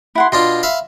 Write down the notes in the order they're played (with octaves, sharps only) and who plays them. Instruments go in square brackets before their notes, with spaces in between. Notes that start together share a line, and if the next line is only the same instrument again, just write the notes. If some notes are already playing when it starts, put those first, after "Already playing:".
[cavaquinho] E4 F#5 C6
[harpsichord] B2 D4 F4 [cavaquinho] C6
[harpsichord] E5 F5 B5